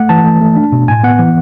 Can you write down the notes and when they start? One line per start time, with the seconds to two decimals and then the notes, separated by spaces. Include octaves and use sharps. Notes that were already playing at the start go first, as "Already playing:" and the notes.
Already playing: A3 F#5
0.09 E3 A5
0.25 A3
0.41 A3
0.57 D4
0.72 B2
0.88 A2 G#5
1.03 B3 F#5
1.19 E3